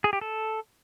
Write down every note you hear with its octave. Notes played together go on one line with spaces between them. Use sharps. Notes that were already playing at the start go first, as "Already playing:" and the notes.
G#4
G4
A4